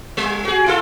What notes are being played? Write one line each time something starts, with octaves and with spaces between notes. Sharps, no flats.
G3
F#4 G#4
E4 F4 A4